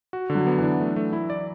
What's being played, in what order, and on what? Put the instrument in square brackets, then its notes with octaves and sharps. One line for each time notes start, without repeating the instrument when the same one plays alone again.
[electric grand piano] F#4
D3
[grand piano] F#3
[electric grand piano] B3
[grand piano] E3 [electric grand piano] D4
[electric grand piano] A3
A3
E4
D5